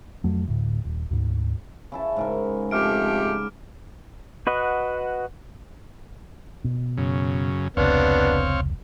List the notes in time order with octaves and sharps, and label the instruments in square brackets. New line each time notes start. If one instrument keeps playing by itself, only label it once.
[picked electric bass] F2 F#3 A3
D2 A2
D#1
D2 G#2
[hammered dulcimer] C#3 E4 A5
G#2 C#3 A#4
[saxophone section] F2 A3 G4 [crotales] D6 F6 D7
[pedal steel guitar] F#4 B4 D#5 F#5
[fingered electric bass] B2
[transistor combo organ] F#2 C#3
[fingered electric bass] F1 C#2 [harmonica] B3 D4 [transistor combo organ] C4 C#5 F5